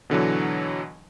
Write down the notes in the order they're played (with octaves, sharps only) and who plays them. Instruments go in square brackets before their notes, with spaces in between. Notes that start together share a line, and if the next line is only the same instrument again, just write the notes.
[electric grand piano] B2 D3 E3 F#3